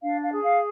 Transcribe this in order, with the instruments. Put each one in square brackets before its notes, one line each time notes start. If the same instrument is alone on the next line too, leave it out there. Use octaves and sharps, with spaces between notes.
[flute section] D4 F5
F5
G#4
F5